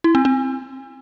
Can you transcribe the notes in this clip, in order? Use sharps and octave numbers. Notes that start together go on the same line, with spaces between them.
E4
C4
C4